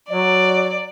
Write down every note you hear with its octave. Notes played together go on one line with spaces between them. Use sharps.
F#3 D5